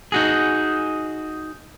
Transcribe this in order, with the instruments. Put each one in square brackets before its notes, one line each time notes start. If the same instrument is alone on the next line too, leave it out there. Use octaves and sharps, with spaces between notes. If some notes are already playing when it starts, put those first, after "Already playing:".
[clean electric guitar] D#4 F#4 G#4